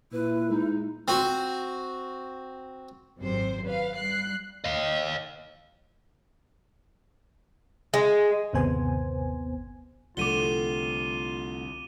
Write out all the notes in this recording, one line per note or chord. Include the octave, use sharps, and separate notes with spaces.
A#2 E4 B4
G#3 D#4
C4 F#4
G#1 F#2 C3 C5
B4 F5
G3 F#6 C7
D#5 F5
G#3
G1 D#2 C3 B3 C5 G#5
C2 D3 F3 A3 F4 D6 D#7 G7